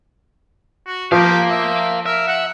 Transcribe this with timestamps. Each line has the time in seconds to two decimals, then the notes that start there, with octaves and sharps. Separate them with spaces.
0.87 F#4
1.12 F3 G4 A#4 F5
1.50 E5
2.06 A#4 E5
2.28 F#5